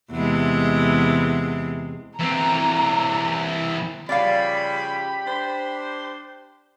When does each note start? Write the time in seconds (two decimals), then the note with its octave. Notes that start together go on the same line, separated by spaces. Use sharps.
0.11 E2 C3 G#3
2.19 E3 C4 A#5
4.09 C#3 F3 G3 G4 D5 F5 B5
5.26 D4 C5